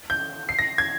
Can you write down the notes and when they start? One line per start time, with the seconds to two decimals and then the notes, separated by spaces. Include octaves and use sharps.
0.10 G6
0.49 C7
0.59 A#6
0.78 G#6